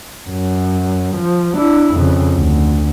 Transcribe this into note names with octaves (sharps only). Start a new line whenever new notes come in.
F#2
F3
D4 E4
F2 C#3
D2